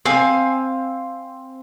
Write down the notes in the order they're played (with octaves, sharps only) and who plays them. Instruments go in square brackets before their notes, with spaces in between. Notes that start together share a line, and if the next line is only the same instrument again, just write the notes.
[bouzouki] C4 F5 G#5